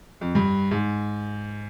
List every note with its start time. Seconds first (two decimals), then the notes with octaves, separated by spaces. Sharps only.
0.21 F2
0.35 G2
0.71 G#2